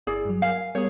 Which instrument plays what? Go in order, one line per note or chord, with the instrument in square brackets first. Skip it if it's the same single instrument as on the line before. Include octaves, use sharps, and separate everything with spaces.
[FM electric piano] G1 [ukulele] E4 G#4 D5
[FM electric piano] G2 F#3
[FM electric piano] A#4 G#5 [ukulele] F5
[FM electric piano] G3 B3 A#4 [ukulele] G#4 C#5